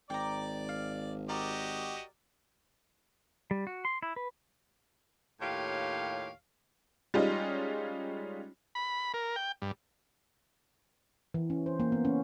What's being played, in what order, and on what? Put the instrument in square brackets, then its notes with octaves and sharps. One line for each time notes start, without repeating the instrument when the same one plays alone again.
[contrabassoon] G#1 [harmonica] D5 D6 [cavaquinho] G5 A#5
[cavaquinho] F5
[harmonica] F#4 G4 D#5 [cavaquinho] A#4 D5
[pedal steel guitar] G3
F#4
C6
E4
B4
[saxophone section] D#2 A2 F4 G4 C#5 F5
[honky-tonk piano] G3 G#3 C#4 D#4 F4
[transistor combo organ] B5
A#4
G5
G2
[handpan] E3
C#4
C5
A#3
B3
C#4